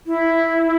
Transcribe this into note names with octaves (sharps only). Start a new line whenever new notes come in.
E4